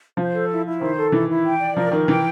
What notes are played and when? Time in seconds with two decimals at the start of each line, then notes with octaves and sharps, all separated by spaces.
0.17 F3 C5
0.34 A4
0.50 E4
0.65 E4
0.81 D#3 C5
0.96 A4
1.12 E3 E4
1.28 E4
1.45 G5
1.60 D5
1.76 F3 A#4
1.92 D#3 A#4
2.08 E3 G5